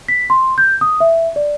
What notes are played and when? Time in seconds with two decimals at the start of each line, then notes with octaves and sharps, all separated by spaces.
0.08 B6
0.30 C6
0.58 G6
0.81 D#6
1.00 E5
1.36 D5